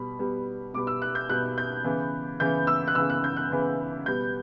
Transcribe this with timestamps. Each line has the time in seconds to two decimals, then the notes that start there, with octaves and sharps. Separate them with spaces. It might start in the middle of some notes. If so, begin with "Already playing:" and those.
Already playing: B2 G3 B3 B5
0.19 B2 G3 B3
0.74 B2 G3 B3 D6
0.87 E6
1.02 F#6
1.15 G6
1.29 B2 G3 B3 F#6
1.58 G6
1.84 C#3 E3 B3
2.40 C#3 E3 B3 G6
2.67 E6
2.88 F#6
2.95 C#3 E3 B3 E6
3.10 F#6
3.24 G6
3.37 F#6
3.52 C#3 E3 B3
4.06 B2 G3 B3 G6